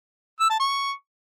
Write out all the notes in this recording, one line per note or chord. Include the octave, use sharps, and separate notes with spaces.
E6
A5
C#6